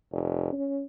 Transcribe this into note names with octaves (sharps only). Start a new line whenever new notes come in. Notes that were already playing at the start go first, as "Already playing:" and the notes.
F1
C#4